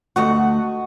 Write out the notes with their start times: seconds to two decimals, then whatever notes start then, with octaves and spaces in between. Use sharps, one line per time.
0.16 D2 A3 F#4 D#5 F#5